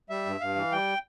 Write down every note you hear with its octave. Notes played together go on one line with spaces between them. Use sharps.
G3 E5
G2
G2 F5
E3
G3 G5